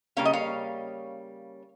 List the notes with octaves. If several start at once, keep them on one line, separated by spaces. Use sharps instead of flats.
C#3 G3 A#3 C#4 F5
D#5
C#5 F5